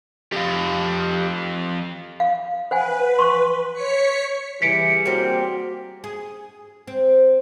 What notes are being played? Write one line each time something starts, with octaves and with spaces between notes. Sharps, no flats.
F2 G4 F5
F5
B4 C5 F#5 G#5
C6 C#6
C#5 B6 C#7
E3 G3 G#4 B6 C#7 D7
A#3 C4 F#4
G#4
C4